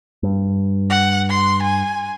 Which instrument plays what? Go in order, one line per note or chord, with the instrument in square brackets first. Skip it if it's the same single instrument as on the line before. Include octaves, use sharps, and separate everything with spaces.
[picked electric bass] G2
[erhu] F#5
C6
G#5